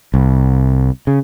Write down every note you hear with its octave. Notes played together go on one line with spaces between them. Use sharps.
C2
C#3